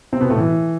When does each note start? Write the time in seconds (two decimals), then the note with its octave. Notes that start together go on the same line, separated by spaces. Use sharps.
0.13 C3 C4
0.21 B2 B3
0.30 A2 A3
0.38 E3